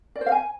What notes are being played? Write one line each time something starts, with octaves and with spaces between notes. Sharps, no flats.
D5
C5
F5
G#5